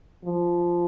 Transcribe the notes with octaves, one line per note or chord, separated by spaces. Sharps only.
F3